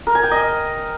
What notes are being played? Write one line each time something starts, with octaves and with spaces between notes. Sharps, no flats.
A#4
G#5
G5
D#5